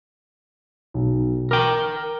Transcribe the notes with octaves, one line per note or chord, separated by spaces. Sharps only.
B1
A#4 G5 D6